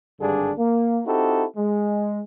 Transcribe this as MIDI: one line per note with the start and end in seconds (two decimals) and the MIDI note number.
0.21 0.51 32
0.21 0.51 43
0.21 0.51 50
0.21 0.51 55
0.21 0.51 62
0.21 0.51 68
0.58 1.00 58
1.06 1.45 60
1.06 1.45 63
1.06 1.45 64
1.06 1.45 66
1.06 1.45 67
1.06 1.45 69
1.57 2.20 56